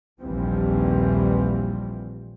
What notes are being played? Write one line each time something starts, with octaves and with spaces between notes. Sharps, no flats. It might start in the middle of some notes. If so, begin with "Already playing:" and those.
A#1 D#2 E3 F3 G3 C4